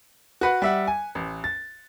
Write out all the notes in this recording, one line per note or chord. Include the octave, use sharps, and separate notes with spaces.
F#4 B4 F#5
G3 E5 F#5
G#5
A1
A6